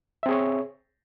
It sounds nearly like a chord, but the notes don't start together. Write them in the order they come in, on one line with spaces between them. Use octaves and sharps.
E5 C4 G#4 C#5